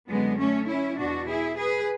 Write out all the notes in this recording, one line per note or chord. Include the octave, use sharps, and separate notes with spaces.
F#2 D3 G#3 B3
A3 C#4
C#4 E4
E2 B2 D4 F#4
E4 G#4
G#4 B4